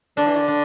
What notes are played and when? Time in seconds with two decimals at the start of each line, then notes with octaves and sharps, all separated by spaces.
0.17 D3 D4
0.27 E3
0.36 D3
0.48 D4